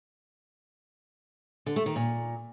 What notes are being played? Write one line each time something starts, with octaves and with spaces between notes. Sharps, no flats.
D3
A3
D#3
A#2